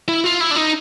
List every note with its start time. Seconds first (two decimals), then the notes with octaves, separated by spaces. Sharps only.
0.09 E4
0.24 F4
0.40 E4
0.51 D4
0.56 D#4